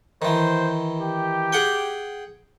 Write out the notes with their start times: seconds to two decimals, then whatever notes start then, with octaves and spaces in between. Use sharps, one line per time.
0.22 D#3 E3 C5
1.00 G4
1.52 G#4 F#5 G5